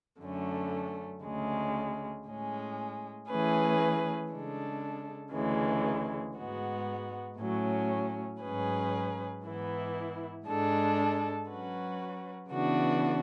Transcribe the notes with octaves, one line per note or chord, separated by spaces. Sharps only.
F#2 D3 A3 C#4
D2 C#3 G#3
A2 G#3 C#4
E3 A3 C#4 G#4 B4
C#3 G#3 D4 A4
D2 C#3 E3 G#3
G#2 G#3 B3 F#4
A2 F#3 C#4
G#2 F#3 C#4 G#4 B4
G#2 E3 B3 E4
G#2 G#3 D4 A4
F#3 C#4 F#4 B4
C#3 E3 B3 D4 F#4